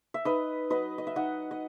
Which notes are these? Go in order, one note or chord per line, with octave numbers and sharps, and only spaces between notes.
E5
D#4 B4 D#5
F#3 B4 D#5
D#5
E5
D#4 D#5 F#5
D#5